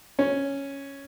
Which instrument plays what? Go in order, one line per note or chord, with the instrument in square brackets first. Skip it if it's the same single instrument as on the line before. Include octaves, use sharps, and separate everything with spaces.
[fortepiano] C#4